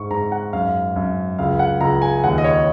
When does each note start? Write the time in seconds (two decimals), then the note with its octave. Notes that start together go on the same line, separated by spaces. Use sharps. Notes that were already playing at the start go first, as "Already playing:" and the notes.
Already playing: G#2 C#6
0.11 G#2 A#5
0.32 F#5
0.53 F#2 F5
0.96 F#2
1.39 C#2 F5
1.59 F#5
1.81 C#2 A#5
2.02 G#5
2.24 D#2 F#5
2.38 D#5
2.44 C#5